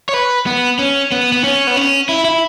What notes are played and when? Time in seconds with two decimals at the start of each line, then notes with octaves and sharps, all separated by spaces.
0.09 C#5
0.14 B4
0.46 B3
0.79 C#4
1.12 B3
1.32 B3
1.44 C#4
1.67 B3
1.77 C#4
2.09 E4
2.25 E4